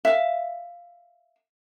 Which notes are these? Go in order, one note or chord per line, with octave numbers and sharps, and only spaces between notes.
E5 F5